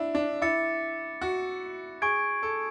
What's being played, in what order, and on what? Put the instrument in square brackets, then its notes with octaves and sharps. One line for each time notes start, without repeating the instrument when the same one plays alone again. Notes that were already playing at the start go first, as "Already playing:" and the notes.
Already playing: [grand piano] D4 E4
D4
[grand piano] E4 [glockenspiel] D6 A6 C#7
[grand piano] F#4
[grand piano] G#4 [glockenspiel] C#6 G#6 D7
[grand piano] A4